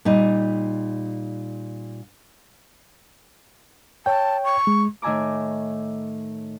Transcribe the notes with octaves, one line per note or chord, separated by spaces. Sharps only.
A#2 G3 D#4
C#5 G5 A5
C#6
G#3
A2 D#3 E5 G#5 A#5 D6